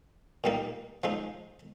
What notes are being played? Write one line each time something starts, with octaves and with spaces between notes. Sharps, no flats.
A#2 G3 A#3 D#4
F3 G#3 D#4